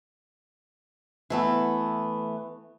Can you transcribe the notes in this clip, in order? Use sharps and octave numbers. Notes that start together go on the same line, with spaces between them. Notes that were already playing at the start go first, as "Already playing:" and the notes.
E3 A3 B3